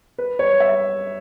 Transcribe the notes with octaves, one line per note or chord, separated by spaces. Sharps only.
B4
C#5
E5